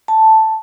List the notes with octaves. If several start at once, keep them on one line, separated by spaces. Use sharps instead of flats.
A5